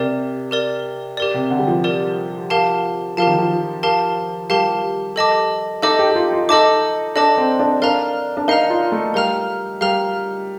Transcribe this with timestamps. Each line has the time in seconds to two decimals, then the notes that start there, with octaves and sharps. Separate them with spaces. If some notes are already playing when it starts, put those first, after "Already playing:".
Already playing: C3 G4 A#4 D5
0.51 G4 A#4 D5
1.17 G4 A#4 D5
1.34 C3
1.50 D3
1.59 G3
1.67 F3
1.84 G4 A#4 D5
2.50 G4 A#4 F5 A5
3.17 F3 G4 A#4 F5 A5
3.27 D#3
3.38 F3
3.83 G4 A#4 F5 A5
4.50 G3 G4 A#4 F5 A5
5.16 A4 D#5 A5 D6
5.82 D#4 A4 D#5 A5 D6
5.99 G4
6.11 G4
6.16 F4
6.32 F4
6.49 D#4 A4 D#5 A5 D6
7.15 D4 A4 D#5 A5 D6
7.37 C4
7.59 D4
7.82 D4 A#4 F5 A#5 F6
8.37 D4
8.48 D#4 A#4 F5 A#5 F6
8.70 F4
8.92 A3
9.14 G3 A#4 F5 A#5 F6
9.81 G3 A#4 F5 A#5 F6